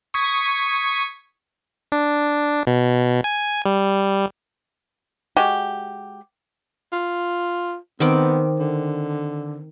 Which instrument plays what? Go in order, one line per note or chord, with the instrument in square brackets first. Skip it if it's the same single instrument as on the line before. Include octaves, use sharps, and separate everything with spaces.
[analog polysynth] C#6 D#6 G#6 B6
[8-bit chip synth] D4
B2
G#5
G3
[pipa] G#3 F#4 G4
[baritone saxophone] F4
[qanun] D#3 C4 D6 [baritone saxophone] B3
[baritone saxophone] D3